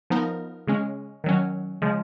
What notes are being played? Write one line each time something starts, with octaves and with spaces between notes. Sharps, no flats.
F3 B3 D#4 A#4
C#3 G#3 C#4
D#3 F#3 C#4
C#3 F3 G#3